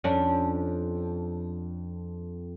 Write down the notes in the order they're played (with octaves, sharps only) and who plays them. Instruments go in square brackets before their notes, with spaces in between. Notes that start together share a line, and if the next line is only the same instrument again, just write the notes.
[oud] F2 C#4 D4